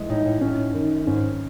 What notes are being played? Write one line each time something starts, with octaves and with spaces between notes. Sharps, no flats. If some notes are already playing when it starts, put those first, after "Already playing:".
Already playing: E3 G#3
A2 D#4
A2
A2 C#4
F#2 D#3
G#2 C#4